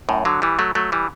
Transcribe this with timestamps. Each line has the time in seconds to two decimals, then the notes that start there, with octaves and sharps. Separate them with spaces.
0.09 F#2 A2
0.25 D3 F#3
0.42 E3 G3
0.59 F#3 A3
0.75 F#3 A3
0.92 E3 G3